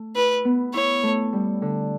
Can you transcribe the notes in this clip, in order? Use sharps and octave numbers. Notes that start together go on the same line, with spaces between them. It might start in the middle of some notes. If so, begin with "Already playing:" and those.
Already playing: A3
E4 B4
B3
E4 C#5
A3
G3
D3